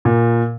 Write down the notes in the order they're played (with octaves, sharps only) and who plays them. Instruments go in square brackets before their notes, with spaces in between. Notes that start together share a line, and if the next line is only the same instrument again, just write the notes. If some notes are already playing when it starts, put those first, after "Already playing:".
[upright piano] A#2